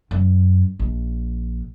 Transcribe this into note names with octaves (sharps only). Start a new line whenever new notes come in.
F#2
A#1